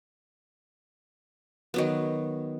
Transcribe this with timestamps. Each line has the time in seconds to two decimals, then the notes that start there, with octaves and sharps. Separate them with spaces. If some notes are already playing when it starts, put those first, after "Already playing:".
1.74 D#3 F#3 B3